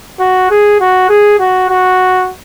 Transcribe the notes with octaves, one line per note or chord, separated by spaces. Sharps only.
F#4
G#4
F#4
G#4
F#4
F#4